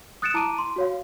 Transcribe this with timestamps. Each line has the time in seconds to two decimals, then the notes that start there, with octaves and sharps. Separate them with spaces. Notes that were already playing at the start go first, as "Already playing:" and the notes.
0.22 D#6 F#6 A6 C#7 D7 E7
0.34 E4 A5 A#5 D6 D7 D#7
0.58 C6
0.76 F#4 C#5 F5